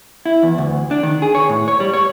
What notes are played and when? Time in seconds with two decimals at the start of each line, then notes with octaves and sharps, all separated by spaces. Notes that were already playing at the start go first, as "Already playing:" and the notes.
0.26 E4
0.43 E2
0.58 D2
0.91 D4
1.03 D#3
1.22 G#4
1.35 C#5
1.49 A2
1.68 C#5
1.80 G3
1.94 C#5